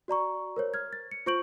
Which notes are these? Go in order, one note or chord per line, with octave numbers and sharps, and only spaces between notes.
F#4 D5 A#5 C#6
A#4 C5 C#5
F6 G#6
A6
C#7
F4 C5 C#6 G6 D7 F#7